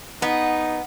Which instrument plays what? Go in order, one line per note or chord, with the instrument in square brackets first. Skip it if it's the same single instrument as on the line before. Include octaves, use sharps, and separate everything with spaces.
[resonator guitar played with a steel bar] B3 [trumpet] D#4